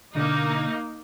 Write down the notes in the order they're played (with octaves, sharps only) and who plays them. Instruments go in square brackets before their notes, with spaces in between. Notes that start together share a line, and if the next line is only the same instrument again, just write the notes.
[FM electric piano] B2 D3 D4 [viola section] A#3 D#4